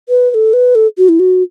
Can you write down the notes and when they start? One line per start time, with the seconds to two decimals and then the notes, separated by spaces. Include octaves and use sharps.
0.09 B4
0.31 B4
0.34 A4
0.53 B4
0.75 A4
0.98 F#4
1.09 E4
1.19 F#4